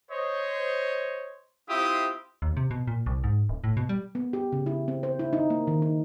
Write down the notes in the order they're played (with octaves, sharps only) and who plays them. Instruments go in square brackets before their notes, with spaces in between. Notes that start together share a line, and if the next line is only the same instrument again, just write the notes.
[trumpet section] C5 C#5 D#5
C4 E4 F4 G4 E5 D#6
[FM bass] D#2
C3
B2
A#2
C2
G#2
D1
A2
B2
G3
[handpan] B3
G4
C#3
E4
C4
C5
E4
D#4
A#3
D#3
D#4